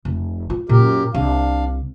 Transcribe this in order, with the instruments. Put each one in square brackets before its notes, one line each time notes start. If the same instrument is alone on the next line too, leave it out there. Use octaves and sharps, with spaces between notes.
[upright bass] F1
F4
[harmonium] F#2 G4 A#4 [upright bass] A#2
[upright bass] C2 [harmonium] D4 F5